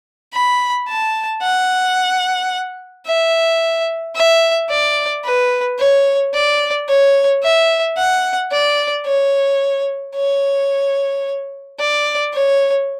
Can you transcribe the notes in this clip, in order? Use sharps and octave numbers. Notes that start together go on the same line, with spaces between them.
B5
A5
F#5
E5
E5
D5
B4
C#5
D5
C#5
E5
F#5
D5
C#5
C#5
D5
C#5